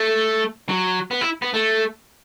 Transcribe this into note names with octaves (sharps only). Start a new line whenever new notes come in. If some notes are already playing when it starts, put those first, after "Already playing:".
Already playing: A3
F#3
B3
E4
B3
A3